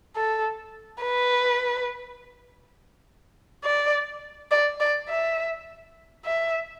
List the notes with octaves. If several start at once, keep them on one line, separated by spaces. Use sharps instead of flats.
A4
B4
D5
D5
D5
E5
E5